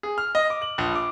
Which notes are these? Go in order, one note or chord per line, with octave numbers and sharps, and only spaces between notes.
G#4
F6
D#5
D6
F#7
A#1
D6